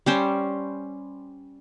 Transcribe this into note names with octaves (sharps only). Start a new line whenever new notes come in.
G3 C#4 C5